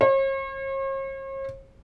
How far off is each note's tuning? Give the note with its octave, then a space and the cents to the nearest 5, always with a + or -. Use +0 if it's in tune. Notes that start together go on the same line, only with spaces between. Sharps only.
C#5 -45